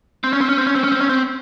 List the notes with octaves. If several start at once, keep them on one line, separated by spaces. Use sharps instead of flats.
C4
C#4
C4
C#4
C4
C#4
C4
C#4
C4
C#4
C4